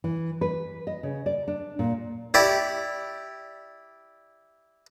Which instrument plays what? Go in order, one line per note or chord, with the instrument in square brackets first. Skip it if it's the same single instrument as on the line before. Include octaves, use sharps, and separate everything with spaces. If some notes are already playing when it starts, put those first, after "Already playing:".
[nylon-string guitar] E3
B4
D#5
C#3
D5
D4
A#2
[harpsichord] E4 G4 D5